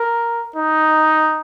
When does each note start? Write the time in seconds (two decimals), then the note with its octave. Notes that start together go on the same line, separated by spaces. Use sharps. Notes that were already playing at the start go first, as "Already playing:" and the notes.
Already playing: A#4
0.56 D#4